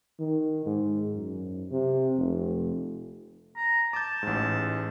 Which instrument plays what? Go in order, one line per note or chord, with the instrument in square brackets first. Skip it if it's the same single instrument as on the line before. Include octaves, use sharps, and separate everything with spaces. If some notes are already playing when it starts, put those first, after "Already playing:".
[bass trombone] D#3
G#2
F#2
C3
F1
[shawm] A#5
[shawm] A5 [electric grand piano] D6 G6
[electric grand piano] A1 G#2